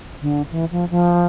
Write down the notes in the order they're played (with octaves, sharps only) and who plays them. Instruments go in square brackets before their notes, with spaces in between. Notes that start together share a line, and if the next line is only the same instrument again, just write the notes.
[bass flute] D3
E3
F3
F3